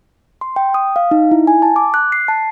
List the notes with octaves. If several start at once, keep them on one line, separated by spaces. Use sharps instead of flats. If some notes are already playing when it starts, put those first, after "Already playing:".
C6
G5
D#6
F5
D#4
E4
G#5
A5
D6
F#6
C7
A5